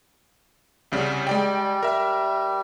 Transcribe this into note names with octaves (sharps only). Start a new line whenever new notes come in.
C2 C#3 G3
G3 G#3 D5 G5
A#4 E5